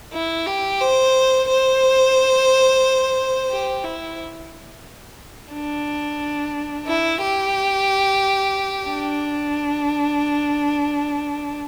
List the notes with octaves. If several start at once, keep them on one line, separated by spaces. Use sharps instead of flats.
E4
G4
C5
C5
G4
E4
D4
E4
G4
D4